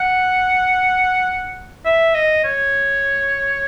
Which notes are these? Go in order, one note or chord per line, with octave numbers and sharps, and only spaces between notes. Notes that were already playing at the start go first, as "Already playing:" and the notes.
Already playing: F#5
E5
D#5
C#5